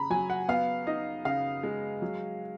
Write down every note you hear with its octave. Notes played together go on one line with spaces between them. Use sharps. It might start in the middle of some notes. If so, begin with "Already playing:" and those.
Already playing: C#3 A#5 B5
F#3 G#5
F#5
B3 F5
D#4 D#5
C#3 F5
G#3
F#3